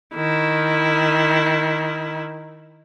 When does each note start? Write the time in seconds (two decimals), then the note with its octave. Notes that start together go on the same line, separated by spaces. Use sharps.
0.15 D#3 E4